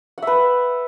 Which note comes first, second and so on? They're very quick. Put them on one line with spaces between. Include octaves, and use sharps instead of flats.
F#5 E5 B4